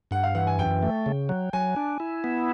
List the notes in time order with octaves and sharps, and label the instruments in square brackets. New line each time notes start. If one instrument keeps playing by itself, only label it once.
[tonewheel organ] G2 [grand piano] F#5
[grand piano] F5
[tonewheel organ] E3 [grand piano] F#5
[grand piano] G#5
[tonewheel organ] F#2 [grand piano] G5
[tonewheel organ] A3
C#3
F#3
[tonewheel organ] F#3 [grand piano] G#5
[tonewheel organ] D4
E4
B3